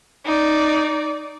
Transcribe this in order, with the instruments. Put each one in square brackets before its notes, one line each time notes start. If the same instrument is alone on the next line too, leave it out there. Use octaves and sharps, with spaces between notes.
[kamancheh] D#4 D5